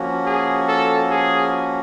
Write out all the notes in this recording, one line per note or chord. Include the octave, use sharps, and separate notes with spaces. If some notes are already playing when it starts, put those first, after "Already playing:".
Already playing: F3 A#3 C#4 F#4
G#4
A4
G#4